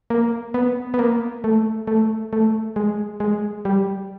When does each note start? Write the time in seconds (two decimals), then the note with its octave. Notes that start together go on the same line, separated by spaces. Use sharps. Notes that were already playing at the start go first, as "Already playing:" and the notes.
0.10 A#3
0.54 B3
0.94 B3
0.99 A#3
1.44 A3
1.87 A3
2.33 A3
2.76 G#3
3.20 G#3
3.65 G3